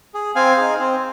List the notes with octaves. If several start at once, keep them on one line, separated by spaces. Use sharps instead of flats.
G#4
C4 F5 G#5
D#4 G#4
C4